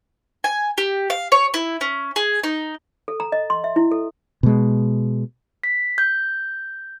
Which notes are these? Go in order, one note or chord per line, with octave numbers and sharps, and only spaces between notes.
G#5
G4
F5
C#5
E4
C#4
G#4
D#4
A4
A#5
D#5
C6
E5
E4
A4
B2 G#3
B6
G6